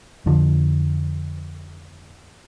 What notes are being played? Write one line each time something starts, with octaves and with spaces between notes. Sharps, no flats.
F2 D3 F3